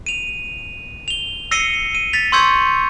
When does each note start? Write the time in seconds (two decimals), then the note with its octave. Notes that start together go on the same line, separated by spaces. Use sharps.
0.06 D#7 F7
1.08 F7 G7
1.51 E6 A#6 C7 C#7 D#7 G7
1.95 D#7
2.13 A6 B6 F7
2.32 C6 C#6 E6 G6 G#6 C#7